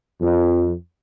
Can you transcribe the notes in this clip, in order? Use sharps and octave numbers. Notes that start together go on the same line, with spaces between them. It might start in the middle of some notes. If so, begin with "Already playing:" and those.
F2